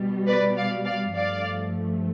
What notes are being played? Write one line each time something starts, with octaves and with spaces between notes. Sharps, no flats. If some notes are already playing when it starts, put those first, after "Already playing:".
Already playing: B2 G3
B4 D5
D5 F5
D5 F5
G2 F3 A3 D5 F5